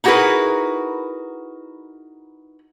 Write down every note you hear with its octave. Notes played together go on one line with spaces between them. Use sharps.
D#4 E4 F#4 G#4 A#4 B4